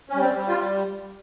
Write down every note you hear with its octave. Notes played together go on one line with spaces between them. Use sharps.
C#4
G3
C4
G3
F4